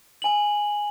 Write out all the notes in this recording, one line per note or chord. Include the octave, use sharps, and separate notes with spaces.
G#5 F#7